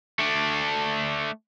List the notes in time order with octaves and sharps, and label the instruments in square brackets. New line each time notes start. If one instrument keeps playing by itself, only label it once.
[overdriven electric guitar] A3 D4